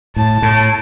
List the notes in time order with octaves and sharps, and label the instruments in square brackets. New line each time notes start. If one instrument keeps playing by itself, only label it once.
[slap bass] A2 [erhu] A5
[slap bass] A2